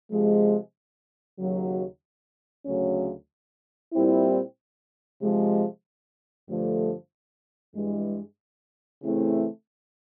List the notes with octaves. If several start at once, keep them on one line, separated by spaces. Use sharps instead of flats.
C3 F3 G#3
D#2 C#3 F#3
D2 C#3 F#3 A3 C#4
A#2 G3 C4 E4
C3 F3 G#3
G2 D3 F3 A3
G2 E3 G#3
C#3 E3 A3 C4 E4